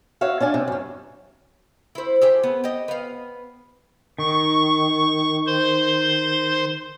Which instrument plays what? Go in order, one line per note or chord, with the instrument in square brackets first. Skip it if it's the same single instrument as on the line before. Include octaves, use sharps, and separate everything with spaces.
[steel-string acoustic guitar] F#4 C#5 E5 F5
C#4 D4 D5 G#5
C3
F#2 C#4
[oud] E4 C5
G4 G#4 E5
B3
G4 D#5
B3 F5
[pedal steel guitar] D#3 [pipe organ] C#6
[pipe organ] C5 C6